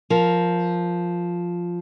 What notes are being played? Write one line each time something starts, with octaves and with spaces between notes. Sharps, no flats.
F3 A#4